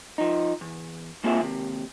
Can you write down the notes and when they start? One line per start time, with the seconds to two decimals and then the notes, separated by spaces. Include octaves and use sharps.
0.18 F3 D#4
0.61 E2
1.24 C2 A#3 C4 F4 G#4 E5
1.40 D#2 C3